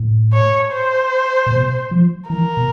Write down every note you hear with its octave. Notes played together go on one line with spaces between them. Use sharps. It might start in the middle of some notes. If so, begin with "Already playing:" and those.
Already playing: A2
C#5
C5
A#2
B2
F3
E3 A#4
B2